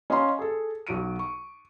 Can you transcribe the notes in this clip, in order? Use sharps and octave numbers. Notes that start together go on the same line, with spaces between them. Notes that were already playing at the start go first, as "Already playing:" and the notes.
C#4 D#5 F5 A#5 C6
G#4 A4
B1 F#4 D7 D#7
C#6